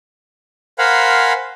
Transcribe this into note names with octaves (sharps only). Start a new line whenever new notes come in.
A#4 C5 F5 F#5 G#5 B5